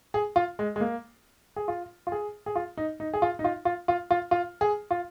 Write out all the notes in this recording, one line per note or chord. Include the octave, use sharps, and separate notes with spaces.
G#4
F4
G#3
G#3
A#3
G#4
F4
F4
G#4
G#4
F4
D#4
D#4
G#4
F4
D#4
F4
F4
F4
F4
F4
G#4
F4